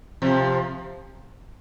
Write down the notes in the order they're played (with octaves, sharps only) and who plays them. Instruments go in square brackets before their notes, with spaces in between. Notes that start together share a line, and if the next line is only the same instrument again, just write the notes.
[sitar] C3 F3